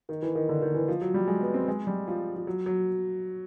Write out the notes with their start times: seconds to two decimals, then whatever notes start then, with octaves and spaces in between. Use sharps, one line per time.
0.09 D#3
0.22 E3
0.35 D#3
0.49 D3
0.62 D#3
0.74 E3
0.88 F3
1.01 F#3
1.14 G3
1.27 G#3
1.41 B3
1.54 C4
1.68 G#3
1.87 G3
2.08 F3
2.36 F3
2.47 F#3
2.66 F#3